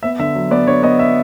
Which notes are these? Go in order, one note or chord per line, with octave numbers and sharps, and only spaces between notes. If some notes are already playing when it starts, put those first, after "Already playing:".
B3 E5
D3 E5
F#3
B3 D5
D3 C#5
B3 D#5
E5